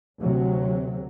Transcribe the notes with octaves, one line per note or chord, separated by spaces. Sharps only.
D2 C3 F#3